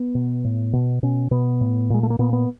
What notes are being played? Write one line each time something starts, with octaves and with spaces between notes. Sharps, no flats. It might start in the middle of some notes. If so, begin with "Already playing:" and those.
Already playing: B3
B2
A2
B2
B2 C#4
B2 B3
A2
A#2 G#3
A3
A#3
A#2 B3
B3